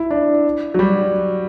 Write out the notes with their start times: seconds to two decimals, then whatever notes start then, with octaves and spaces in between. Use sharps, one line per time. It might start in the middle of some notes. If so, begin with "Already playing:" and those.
Already playing: E4
0.11 D4
0.74 F#3
0.79 G3